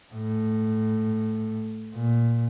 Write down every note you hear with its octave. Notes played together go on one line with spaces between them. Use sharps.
A2
A#2